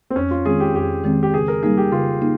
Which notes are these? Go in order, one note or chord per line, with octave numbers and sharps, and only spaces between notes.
C4
F2 C#4
F4
D#3 G#3 C4 G#4
G4
F2 G4
D#3 G#3 C4
G4
C#3 G#4
A#4
G3 A#3 D#4 G#4
G4
C#3 F4
A#3 D#4